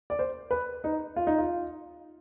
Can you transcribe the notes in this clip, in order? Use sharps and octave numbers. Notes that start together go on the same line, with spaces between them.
D5
C5
B4
D#4
F4
D#4
F4